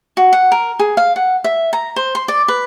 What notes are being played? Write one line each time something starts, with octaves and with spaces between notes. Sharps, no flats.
F#4
F#5
A#4
G#4
F5
F#5
E5
A#5
C5
C6
D5
B4